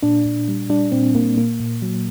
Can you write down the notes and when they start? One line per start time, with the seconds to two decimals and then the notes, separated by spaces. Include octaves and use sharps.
0.03 A#2 D4
0.25 A#2
0.48 G3
0.70 G3 D4
0.92 A#2 C4
1.15 A#2 A#3
1.37 A#2 A#3
1.60 A#2
1.82 F#3